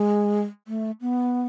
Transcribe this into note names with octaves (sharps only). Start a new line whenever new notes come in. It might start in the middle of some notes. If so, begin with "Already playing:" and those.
Already playing: G#3
A3
B3